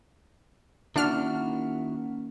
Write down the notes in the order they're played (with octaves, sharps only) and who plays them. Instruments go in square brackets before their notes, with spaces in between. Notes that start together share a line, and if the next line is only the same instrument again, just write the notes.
[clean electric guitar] D#3 E4 F#4 [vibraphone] A#3 C#4 [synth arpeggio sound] D4 F6